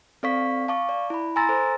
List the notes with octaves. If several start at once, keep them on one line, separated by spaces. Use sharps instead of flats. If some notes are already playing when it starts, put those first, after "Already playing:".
C4 A4 D5 F5 C#6 B6
F5 A5 C#6 D6
D5
E4 B5
G#5 A#5 C6 E6 A6 A#6
A4 C5